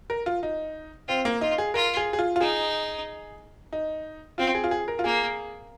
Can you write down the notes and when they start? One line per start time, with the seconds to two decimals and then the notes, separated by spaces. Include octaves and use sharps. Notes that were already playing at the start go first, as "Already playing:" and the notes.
0.10 A#4
0.26 F4
0.43 D#4
1.08 C4 F4
1.25 A#3
1.41 D#4 F4
1.58 G#4
1.74 F4 A#4
1.97 G#4
2.13 G#4
2.19 F4
2.36 F4
2.40 D#4 G#4
3.73 D#4
4.38 C4 F4
4.55 G#4
4.64 F4
4.71 G#4
4.88 A#4
4.99 F4
5.04 A#3 G#4